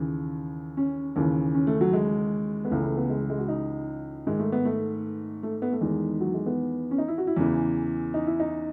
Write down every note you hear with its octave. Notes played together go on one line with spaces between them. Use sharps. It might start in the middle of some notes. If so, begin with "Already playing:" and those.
Already playing: D#2 C#3 E3
C#4
D#2 C#3 E3
C#4
A3
F#3
G#3
B3
C#2 C#3 E3 A3
A3
B3
G#3
G#3
F#4
D#4
G#2 D#3 G#3
A3
B3
A3
A3
B3
A3
E2 D#3 G#3
F#3
G#3
B3
C#4
D#4
E4
F#4
E4
E2 C#3 E3
D#4
E4
D#4